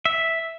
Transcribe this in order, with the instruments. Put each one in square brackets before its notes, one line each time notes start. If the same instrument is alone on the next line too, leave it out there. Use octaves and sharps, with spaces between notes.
[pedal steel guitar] E5